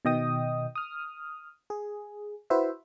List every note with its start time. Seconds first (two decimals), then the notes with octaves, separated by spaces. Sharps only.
0.05 B2 D#3 D#5 G5 D#6
0.75 D#6 F6
1.70 G#4
2.50 E4 F#4 B4 C5 E5